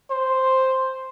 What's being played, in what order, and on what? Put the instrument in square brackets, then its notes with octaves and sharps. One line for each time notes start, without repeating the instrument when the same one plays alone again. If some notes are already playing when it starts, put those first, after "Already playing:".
[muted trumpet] C5